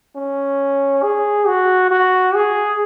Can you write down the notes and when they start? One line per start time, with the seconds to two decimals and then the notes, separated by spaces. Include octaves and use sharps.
0.16 C#4
1.03 G#4
1.47 F#4
1.91 F#4
2.35 G#4